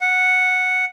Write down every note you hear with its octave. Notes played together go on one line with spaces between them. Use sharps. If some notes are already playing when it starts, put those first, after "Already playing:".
F#5